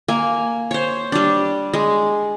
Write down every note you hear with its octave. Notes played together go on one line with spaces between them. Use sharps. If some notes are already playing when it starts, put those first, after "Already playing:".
A#3 G#5
C5 C#5
G3 D4
G#3